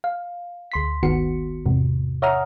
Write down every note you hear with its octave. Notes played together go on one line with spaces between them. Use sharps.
F5
D2 C6 B6
G1 D#3 B3 F#4 C#7
E2 G#2 C3
C#5 E5 F#5 A#5 D#6 F6